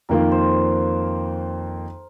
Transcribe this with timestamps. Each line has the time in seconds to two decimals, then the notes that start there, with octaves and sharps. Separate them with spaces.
0.09 F2 D#3 A#3 F4 A#4
0.32 C5